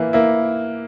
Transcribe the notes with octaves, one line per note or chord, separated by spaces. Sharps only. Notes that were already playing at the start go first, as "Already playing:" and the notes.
Already playing: E3 A#3 E4
A#3 E4